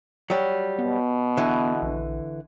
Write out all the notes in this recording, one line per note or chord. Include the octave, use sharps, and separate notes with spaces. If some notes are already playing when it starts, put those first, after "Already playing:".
F#3 G3
B2 B3
D3 E3
A#1